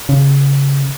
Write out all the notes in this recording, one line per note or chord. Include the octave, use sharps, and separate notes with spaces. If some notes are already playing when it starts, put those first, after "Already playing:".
C#3